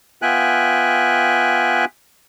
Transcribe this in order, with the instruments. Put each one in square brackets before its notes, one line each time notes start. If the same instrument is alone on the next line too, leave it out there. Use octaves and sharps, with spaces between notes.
[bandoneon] B3 F4 E5 G5 G#5 F#6